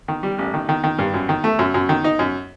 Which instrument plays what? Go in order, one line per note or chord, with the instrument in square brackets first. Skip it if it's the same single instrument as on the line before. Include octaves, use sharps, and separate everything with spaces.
[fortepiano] D#3
G3
A1
D#3
D#3
D#3
G2
F#2
D#3
A3
F#2
F#2
D#3
D#4
F#2